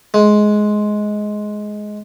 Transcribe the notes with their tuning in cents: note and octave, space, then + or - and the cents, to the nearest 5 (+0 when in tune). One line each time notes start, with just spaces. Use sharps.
G#3 +15